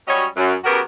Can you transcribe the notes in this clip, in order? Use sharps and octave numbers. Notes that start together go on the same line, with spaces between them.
F#3 G3 C#4 F#4 C#5 D#5
F#2
C#3 F#3 B3 F#4 G4 A#4